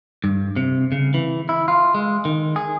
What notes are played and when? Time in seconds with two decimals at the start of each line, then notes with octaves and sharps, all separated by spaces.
0.24 G2
0.56 C3
0.92 C#3
1.14 E3
1.49 E4
1.68 F4
1.95 G#3
2.25 D#3
2.56 G#4